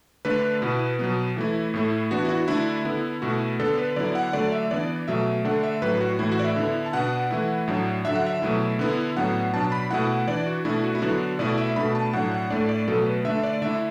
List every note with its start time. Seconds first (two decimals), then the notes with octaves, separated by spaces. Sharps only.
0.25 D3 A3 D4 B4
0.62 B2 B3 E4
0.99 B2 F#3 B3
1.37 E3 A3 E4
1.74 A2 A3 E4
2.11 E3 B3 D4 F#4
2.25 E4
2.29 F#4
2.48 D3 A3 D4 E4
2.85 D3 B3 E4
3.22 B2 A3 E4 F#4
3.59 D3 B3 D4 A4
3.78 B4
3.96 D3 F#3 B3 E4 D5
4.15 F#5
4.33 D3 F#3 A3 D5
4.52 E5
4.71 E3 B3 D4 D5
5.08 B2 F#3 A3 E5
5.45 D3 A3 D4 F#5
5.63 E5
5.82 A2 F#3 D4 B4
6.01 F#4
6.19 A2 E3 A3 E4
6.32 F#4
6.40 D5
6.44 E5
6.56 D3 B3 E4
6.86 A5
6.93 B2 B3 D4 F#5
7.30 E3 A3 E4
7.68 A2 F#3 D4
8.05 D3 F#3 D4 E5
8.16 F#5
8.26 E5
8.42 B2 F#3 A3 E4
8.79 D3 B3 E4
9.16 A2 F#3 B3 D4 F#5
9.54 B2 F#3 D4 A5
9.72 B5
9.90 B2 A3 E4 F#5
10.27 E3 D4 D5
10.46 F#4
10.65 B2 A3 D4 E4
10.84 F#4
10.95 E4
11.02 D3 F#3 B3 D4 F#4
11.39 B2 A3 E4 D5
11.58 E5
11.76 B2 A3 D4 B5
11.95 A5
12.13 A2 F#3 D4 F#5
12.31 F#5
12.50 A2 A3 D4 D5
12.69 D5
12.88 B2 F#3 A3 A4
13.06 B4
13.24 D3 A3 D4 E5
13.43 D5
13.62 D3 A3 E4 E5